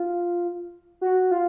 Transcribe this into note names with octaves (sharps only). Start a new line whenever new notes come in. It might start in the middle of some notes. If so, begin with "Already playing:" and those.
Already playing: F4
F#4
F4